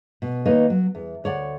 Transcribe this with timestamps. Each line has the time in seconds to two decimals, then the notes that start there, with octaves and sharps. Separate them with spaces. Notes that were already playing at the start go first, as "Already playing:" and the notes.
0.22 B2
0.45 D#2 A#3 D#4 B4 C#5 D#5
0.70 F#3
0.95 E2
1.24 D2 C#5 D5 F#5